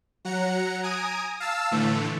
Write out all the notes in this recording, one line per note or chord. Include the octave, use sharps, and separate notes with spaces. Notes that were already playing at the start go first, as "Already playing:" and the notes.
F#3 F#5 A#5 C#7
G#5 A#5 D#6 D7 D#7
F5 A5 E6
A2 D3 E3 A3